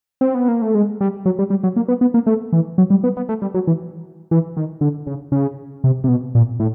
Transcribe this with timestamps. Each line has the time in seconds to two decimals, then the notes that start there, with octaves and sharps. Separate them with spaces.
0.21 C4
0.35 B3
0.48 A#3
0.62 A3
0.75 G#3
1.01 G3
1.26 F#3
1.39 G3
1.50 G3
1.64 F#3
1.76 A#3
1.88 B3
2.01 B3
2.14 A#3
2.27 A3
2.53 E3
2.78 F#3
2.90 G3
3.04 B3
3.17 B3
3.29 A3
3.42 G3
3.54 F#3
3.67 E3
4.31 E3
4.57 D#3
4.81 D3
5.07 C#3
5.32 C#3
5.84 C3
6.04 C3
6.08 B2
6.35 A#2
6.60 A2